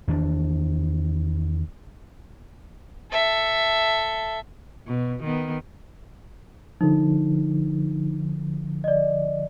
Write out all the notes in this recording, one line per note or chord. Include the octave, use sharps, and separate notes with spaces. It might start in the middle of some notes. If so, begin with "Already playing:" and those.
E2 D#3 D4
A4 E5
B2
D#3 B3
D3 F3 D#4
D5 D#5